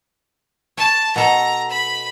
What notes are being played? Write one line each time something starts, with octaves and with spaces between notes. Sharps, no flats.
C#5 A5
B2 A4 A#5
B5